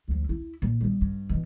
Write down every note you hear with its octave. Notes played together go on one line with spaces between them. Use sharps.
D2 F3
E4
A#2
G3 B3
G2
B2 E3